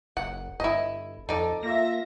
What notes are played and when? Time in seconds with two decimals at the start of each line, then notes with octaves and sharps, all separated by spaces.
0.17 F#1 F#5
0.60 G1 E4 D#5
1.29 F2 D#4 A4 D5
1.63 A#3 F4 E5 A#6